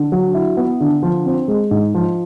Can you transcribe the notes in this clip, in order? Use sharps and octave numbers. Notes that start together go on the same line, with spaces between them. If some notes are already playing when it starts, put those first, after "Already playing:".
Already playing: D3
F#3
E4
B3
D3
F3
C4
G#3
G#2
F3